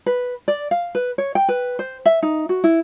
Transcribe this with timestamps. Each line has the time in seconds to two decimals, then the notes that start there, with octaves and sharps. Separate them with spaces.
0.06 B4
0.48 D5
0.71 F5
0.95 B4
1.18 C#5
1.35 G5
1.49 B4
1.79 C5
2.06 E5
2.23 D#4
2.49 F#4
2.64 E4